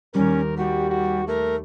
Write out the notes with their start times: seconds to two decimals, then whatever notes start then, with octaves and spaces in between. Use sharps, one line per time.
0.14 D#2 G3 C#4 A#4
0.58 G3 F#4 G4 B6
0.90 F#4
1.28 A3 A#4